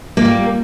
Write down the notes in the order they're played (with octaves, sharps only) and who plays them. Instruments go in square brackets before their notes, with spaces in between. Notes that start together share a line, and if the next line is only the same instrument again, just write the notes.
[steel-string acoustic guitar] A#3
F4
G3